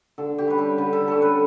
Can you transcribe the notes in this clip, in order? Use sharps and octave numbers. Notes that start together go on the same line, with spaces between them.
D3 A4
G4
G3 C#4 B4
A4
D3 B4
A4
G3 C#4 A4
B4